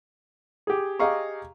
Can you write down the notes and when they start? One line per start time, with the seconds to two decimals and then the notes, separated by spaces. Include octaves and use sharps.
0.67 G4 G#4
0.99 G4 G#4 D#5 F5 A#5 C#6